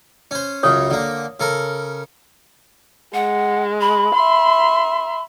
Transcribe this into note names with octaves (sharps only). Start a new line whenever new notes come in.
C#4 C5
C#2 F#2 C#3 C#5 D#6
D3 A#3
C#3 A4 A#4
G#3 F#5
B5
E5 C6